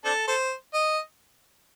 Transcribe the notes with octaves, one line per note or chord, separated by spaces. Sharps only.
C4 D4 A4
A4 C5
D#5